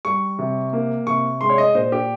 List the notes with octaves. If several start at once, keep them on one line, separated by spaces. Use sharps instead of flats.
G3 C#6
C3
A#3
C3 C#6
G#3 C6
C#5
D#5
A#2 C5
G4